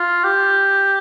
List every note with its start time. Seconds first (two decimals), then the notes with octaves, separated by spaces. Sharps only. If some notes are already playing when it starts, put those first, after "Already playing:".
Already playing: F4
0.24 G4